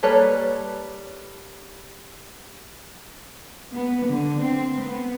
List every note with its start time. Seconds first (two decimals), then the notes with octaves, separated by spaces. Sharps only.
0.03 G3 A#3 A4 B4 C#5
3.72 B3
4.04 D3
4.41 C4
4.80 B3